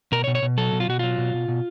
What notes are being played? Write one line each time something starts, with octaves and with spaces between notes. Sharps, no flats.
B2 A#4
C#5
B2
C#5
B2
F#3 A4
B2
F4
B2 F#4
F#3 F4
B2
B2
B2